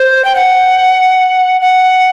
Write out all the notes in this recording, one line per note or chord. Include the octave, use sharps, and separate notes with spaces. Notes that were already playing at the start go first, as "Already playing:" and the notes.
Already playing: C5
G5
F#5
F#5